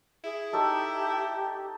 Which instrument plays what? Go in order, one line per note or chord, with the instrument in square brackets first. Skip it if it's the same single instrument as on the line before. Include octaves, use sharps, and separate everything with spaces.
[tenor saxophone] E4 [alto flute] G#4
[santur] D#4 A4 C#5 [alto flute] G4